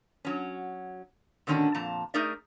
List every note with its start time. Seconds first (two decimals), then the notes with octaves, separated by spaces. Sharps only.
0.25 F#3 C#4
1.47 A#2 D3 D#3 C#4 D4 F#4
1.75 F2 A#2 A5 A#5
2.14 A3 D#4 G#4 A#4 D5 E5